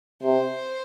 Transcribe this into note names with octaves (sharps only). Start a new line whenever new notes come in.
C3 C5